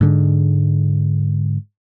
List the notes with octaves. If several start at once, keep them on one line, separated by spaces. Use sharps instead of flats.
G#2 D3 G#3